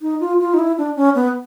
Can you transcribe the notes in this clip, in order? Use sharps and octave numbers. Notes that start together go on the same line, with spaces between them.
D#4
F4
F4
D#4
E4
D4
C#4
B3